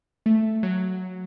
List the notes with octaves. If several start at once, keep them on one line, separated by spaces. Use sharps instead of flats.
A3
F#3